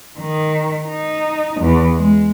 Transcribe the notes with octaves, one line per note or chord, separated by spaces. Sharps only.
D#3
D#4
E2
G#3